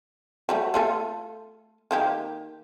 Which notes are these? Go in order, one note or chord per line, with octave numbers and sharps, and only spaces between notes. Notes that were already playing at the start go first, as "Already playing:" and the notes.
F#3 G3 A3
A3 F4 A4
D#3 A#3 G4